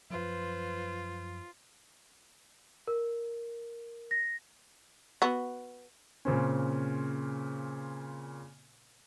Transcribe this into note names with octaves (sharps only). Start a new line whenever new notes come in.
F#2 F3 F#3 F4 B4 C5
A#4
A#6
B3 F#4
A#2 C#3 C4 C#4